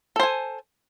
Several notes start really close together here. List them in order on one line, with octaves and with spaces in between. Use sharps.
A4 C5 G#5